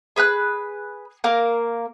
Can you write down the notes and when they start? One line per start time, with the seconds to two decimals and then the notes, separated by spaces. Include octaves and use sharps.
0.16 G#4 B4 F6 F#6
1.24 A#3 A#4 F5